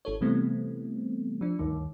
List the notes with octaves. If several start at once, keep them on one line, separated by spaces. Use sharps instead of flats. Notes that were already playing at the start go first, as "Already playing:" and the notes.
G#1 A4 C#5
C3 E3 G3 A3 B3 C4
F3 D4
D2 G2 D#3